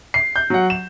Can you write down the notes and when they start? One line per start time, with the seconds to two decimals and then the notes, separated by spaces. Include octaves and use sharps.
0.14 C7
0.36 G6
0.50 F#3 F#5
0.70 E7